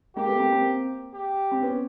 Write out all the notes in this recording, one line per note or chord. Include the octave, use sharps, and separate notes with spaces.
G#3 A#3 G4
A3 B3
A#3 C4
A#3 C4
G4
C4
B3 C#4